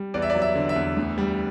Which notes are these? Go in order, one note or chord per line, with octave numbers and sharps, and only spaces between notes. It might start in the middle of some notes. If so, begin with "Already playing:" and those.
Already playing: G3
E2 D5
E5
D5
F#3
E5
D3
E5
E2
D2
G3